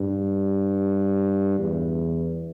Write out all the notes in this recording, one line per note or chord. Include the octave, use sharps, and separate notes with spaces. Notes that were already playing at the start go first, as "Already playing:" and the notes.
Already playing: G2
E2